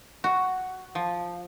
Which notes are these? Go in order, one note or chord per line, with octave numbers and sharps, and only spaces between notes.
F#4
F3